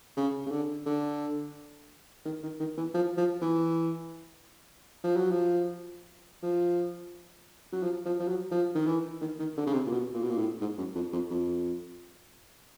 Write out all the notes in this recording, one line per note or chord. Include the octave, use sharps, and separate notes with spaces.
C#3
C#3
D3
D3
D#3
D#3
D#3
E3
F3
F3
E3
F3
F#3
F3
F3
F#3
F3
F3
F3
F#3
F3
D#3
E3
D#3
D#3
D3
C#3
C3
A#2
B2
A#2
B2
A#2
A2
G#2
F#2
F2
F2
F2